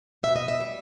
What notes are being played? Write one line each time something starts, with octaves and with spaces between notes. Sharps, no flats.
B2 E5
D#5
E5
G3